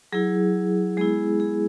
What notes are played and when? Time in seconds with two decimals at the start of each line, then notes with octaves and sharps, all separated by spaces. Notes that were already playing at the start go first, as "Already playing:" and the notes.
0.13 F#3 E4 G#4
0.97 G#3 B3 E4 G#4
1.40 G#4